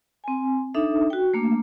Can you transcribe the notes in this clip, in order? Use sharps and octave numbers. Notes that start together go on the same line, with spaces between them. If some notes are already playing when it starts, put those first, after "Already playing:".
C4 G#5
D4 D#4 A4 E5
F#4 G5
A3 A#3 D4